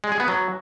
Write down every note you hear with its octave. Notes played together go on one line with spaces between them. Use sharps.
G#3
G#4
B3
F#3